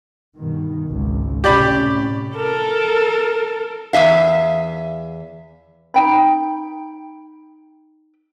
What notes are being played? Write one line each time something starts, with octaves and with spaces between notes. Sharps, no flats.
G2 B2 D#3
G#1 C#2 G#2
A2 C3 C#4 G4 D5 B5
A4 A#4
E2 G3 E5 F5
D#4 G5 B5